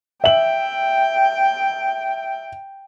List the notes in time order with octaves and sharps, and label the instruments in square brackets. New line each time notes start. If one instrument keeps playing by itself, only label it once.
[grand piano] E5 F#7 [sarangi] G5